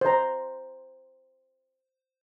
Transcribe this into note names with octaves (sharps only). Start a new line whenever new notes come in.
C5 A#5